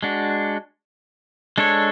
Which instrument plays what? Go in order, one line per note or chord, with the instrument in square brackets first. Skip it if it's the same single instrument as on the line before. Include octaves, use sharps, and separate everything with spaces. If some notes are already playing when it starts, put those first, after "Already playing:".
[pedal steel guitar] G#3 D4 F#4
G#3 D4 A4 C#5